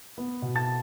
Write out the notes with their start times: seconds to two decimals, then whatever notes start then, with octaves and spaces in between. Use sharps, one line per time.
0.18 B3
0.42 B2
0.55 A5 A6